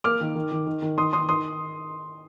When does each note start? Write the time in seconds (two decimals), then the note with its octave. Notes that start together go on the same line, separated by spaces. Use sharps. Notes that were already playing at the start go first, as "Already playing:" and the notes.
0.04 A#3 D6 F6
0.21 D#3
0.35 D#3
0.51 D#3
0.67 D#3
0.82 D#3
0.98 D#3 C6 D#6
1.13 D#3 C6 D#6
1.28 D#3 C6 D#6